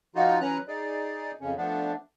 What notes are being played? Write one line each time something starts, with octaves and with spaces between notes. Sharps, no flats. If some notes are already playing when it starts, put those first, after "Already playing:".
F3 D#4 F4 F#4
E3 F#3 C#4 B4 A#5 F#6
D#4 G#4 D5
F2 C#3 C#4
F3 A3 B3 D4